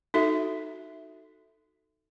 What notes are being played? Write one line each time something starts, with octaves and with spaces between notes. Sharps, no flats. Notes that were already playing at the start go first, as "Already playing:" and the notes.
D#4 F#4 A4 E5